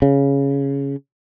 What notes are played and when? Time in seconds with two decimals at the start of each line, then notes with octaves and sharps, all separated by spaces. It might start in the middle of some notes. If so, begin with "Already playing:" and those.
0.02 C#3